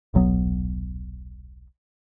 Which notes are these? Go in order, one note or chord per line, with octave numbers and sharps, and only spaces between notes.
D#1 B1 F#3 B3